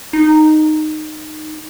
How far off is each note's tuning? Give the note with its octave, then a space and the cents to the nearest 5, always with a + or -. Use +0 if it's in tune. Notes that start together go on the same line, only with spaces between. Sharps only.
D#4 -10